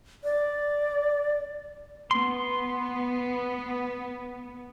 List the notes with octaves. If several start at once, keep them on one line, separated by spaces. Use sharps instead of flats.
D5
B3 C6